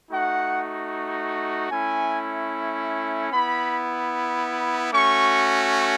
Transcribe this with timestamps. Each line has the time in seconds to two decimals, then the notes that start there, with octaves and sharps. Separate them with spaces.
0.11 A3 D#4 F#4 F#5
1.72 A3 C#4 E4 G#5
3.32 B3 E4 B5
4.92 A3 C#4 F#4 C#6